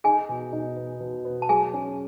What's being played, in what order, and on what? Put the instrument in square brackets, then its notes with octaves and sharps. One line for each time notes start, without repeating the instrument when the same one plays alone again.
[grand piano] D#4 [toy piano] G#4 G#5
[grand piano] B2
D#4
B3
B2
B3
[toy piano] A5
[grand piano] F#3 [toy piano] G#4 G#5
[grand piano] C#4